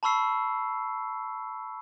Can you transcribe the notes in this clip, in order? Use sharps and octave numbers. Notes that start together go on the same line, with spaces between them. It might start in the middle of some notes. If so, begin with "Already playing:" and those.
A5 B5 C#6 E6 C7